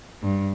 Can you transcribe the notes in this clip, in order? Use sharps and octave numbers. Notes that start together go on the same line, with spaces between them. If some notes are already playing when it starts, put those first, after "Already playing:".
G2